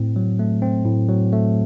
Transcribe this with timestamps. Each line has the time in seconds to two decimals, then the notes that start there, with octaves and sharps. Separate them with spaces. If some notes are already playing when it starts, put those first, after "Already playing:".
Already playing: A2 C4
0.16 F#3
0.39 A3
0.62 C4
0.85 A2
1.08 F#3
1.32 A3